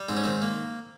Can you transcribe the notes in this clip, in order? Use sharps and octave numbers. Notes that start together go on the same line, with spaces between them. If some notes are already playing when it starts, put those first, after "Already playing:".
Already playing: G3
G#2 C4
C#4
D#3 C4
A#3